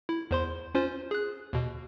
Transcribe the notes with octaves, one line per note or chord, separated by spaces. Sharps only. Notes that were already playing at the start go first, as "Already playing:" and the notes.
E4
E2 C5 C6
C#4 F4 C5
G#4 F#6
D#2 B2